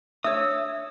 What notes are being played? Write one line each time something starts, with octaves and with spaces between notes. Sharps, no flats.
D4 C#5 E5 D#6 E6